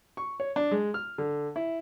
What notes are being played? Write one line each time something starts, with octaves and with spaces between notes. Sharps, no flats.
C#6
C#5
D4
G#3
F6
D3
E4